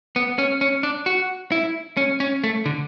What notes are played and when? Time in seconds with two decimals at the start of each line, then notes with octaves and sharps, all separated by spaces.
0.16 B3
0.38 C#4
0.61 C#4
0.83 D4
1.06 F#4
1.52 E4
1.97 C#4
2.20 C#4
2.44 A3
2.66 D3